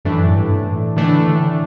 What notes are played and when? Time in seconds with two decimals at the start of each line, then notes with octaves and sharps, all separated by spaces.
0.05 F#2 A2 E3 A3 D4
0.29 G2
0.52 A2
0.96 A2 D3 E3 A3 D4
1.27 D3